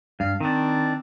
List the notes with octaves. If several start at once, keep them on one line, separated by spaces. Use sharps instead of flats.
G2 F5
D#3 C4 D4